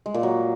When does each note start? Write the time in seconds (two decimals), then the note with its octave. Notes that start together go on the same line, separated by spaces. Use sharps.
0.06 G#3
0.14 A#2
0.23 F#3